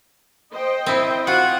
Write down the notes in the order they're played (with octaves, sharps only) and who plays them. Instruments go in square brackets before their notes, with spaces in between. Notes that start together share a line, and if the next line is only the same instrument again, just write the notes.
[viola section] C5 D#5 G5
[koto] C4 E4
[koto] F4 [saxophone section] F#4 F#5